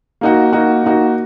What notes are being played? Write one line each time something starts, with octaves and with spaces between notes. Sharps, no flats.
A#3 D#4 F#4
A#3 D#4 F#4
A#3 D#4 F#4